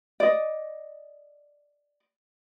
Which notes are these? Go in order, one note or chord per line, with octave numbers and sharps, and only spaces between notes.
D5 D#5